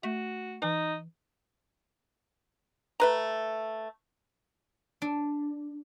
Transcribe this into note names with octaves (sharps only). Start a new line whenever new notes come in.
A3 F#4
E3 D#4
A3 B4 A#5
D4